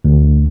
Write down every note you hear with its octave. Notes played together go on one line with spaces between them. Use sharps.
D2